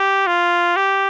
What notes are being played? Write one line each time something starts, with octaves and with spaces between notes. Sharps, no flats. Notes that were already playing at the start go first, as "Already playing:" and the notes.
Already playing: G4
F4
G4